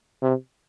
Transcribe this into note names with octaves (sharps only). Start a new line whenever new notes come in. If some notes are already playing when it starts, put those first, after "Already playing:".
C3